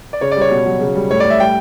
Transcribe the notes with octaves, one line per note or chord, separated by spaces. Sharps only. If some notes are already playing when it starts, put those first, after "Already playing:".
D5
C#3 C#5
D5
G3 C#5
B2
F#3
C#3
G3
A2 C#5
D5
A2
E5
G3 G5